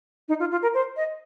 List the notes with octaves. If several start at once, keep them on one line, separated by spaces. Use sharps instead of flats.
D#4
F4
F4
A#4
C5
D#5